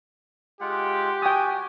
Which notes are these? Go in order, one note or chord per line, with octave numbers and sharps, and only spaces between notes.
G#3 F4 G4 F#5
F#4 G5 G#5 D#6